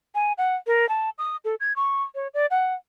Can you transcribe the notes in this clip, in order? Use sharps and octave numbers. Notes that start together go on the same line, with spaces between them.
G#5
F#5
A#4
A5
D#6
A4
G#6
C#6
C#5
D5
F#5